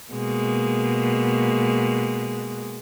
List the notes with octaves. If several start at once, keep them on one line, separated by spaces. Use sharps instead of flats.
B2 G#3 A#3